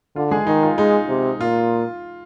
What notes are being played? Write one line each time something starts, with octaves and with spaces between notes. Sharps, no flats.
D3 F4
G#3 G#4
D#3 D#4
F4
G#3 D#4
C3
A#2 F4